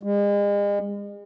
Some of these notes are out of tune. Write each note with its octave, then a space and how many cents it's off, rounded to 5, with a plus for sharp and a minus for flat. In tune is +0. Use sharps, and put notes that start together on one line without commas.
G#3 -40